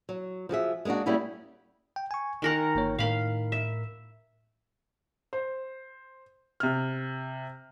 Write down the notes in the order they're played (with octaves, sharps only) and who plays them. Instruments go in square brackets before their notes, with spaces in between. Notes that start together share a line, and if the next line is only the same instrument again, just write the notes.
[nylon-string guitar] F#3
F3 F#4 G#4 E5
G#3 A#3 C#4 D4 F#4
G3 A#3 C#4 E4 F#4 G#4
[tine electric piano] G5
G#5 C#6
[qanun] D#3 A#4 F#5 [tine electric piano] D#4 G#5
[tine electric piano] G1 A#3 C#5
[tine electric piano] A2 A#4 [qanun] F5 B5
[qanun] E5
[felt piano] C5
C3 F6